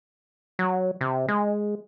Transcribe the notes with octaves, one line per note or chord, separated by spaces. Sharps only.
F#3
C3
G#3